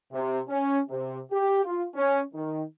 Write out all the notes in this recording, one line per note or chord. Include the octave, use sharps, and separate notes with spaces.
C3
C#4
C3
G4
F4
C#4
D#3